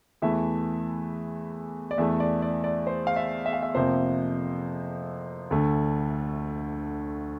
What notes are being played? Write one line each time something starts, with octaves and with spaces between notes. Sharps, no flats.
E2 E3 A3 E5
D5
E2 E3 A3 E5
D5
D5
D5
C5
F5
E5
E5
F5
E5
F2 C3 F3 A#3 C5
D2 D3 A3